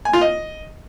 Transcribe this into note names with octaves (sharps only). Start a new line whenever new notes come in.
G#5
F4
D#5